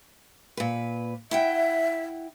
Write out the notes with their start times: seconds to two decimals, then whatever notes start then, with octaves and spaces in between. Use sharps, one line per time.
0.57 A#2 B4
1.31 E4 E5 F#5 G5